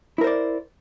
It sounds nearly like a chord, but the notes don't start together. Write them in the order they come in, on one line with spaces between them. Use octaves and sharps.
E4 A#4 C5 D5